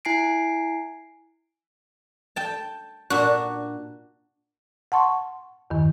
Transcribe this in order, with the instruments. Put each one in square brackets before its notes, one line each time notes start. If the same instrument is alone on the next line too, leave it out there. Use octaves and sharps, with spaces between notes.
[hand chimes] E4 G#5 C7 D7
[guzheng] G5 A5
A#2 D4 F#4
[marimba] F#5 A5 C6 C#6
E2 G2 D#3